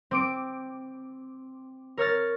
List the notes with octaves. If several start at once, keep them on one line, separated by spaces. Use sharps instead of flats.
C4 D6 D7
A#4 C#5 F6 A6